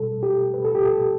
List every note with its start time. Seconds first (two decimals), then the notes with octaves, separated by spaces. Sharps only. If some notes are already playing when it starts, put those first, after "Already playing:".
Already playing: B2 G3 A4
0.23 G4
0.54 B4
0.65 A4
0.75 G4
0.85 A4